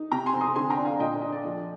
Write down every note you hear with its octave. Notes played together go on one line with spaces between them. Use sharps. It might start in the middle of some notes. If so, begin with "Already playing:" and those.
Already playing: D#4
C3 G5 A#5
G#5 C6
C4
C6 D#6
D3 G#5 C6
G5 A#5
D4
F5 G#5
A#2 D#5 G5
D4 D#5
D5
F3